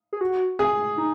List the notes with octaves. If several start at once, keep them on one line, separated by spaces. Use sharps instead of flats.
G#4
F#4
G#4
D#4